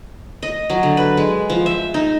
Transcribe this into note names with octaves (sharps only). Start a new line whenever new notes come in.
D#5
F#3
D3
B4
G#3
F3
E5
D#4